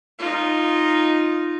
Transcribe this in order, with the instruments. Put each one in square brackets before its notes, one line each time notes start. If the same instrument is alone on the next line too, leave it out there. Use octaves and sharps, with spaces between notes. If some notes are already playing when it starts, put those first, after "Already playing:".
[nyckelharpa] D#4 F4